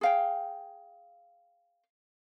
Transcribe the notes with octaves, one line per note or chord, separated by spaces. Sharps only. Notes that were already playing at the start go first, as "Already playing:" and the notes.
G#4 F5 G5